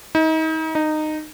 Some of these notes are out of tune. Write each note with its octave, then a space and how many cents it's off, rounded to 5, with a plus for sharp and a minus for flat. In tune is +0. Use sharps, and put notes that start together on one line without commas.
D#4 +35
D#4 -15